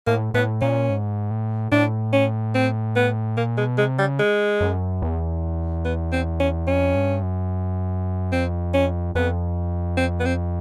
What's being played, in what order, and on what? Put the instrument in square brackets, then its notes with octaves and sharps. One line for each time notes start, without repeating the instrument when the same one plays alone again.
[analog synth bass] A2 [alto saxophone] A#3
[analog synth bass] A2 [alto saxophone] B3
[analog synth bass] A#2 [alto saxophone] C#4
[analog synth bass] G#2
A2
[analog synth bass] A2 [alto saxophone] D4
[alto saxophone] C#4
C4
B3
[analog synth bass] A#2 [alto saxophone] A#3
[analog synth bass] B2 [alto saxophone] G#3
[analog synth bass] C3 [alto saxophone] G#3
[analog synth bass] C#3 [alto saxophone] G3
[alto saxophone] G#3
[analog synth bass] F#2
E2
[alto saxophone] B3
C4
C#4
[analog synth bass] F2 [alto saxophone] C#4
[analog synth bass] G2
F#2
[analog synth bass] F2 [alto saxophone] C4
[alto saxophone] C#4
[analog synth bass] F2 [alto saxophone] B3
[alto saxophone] C4
B3
C4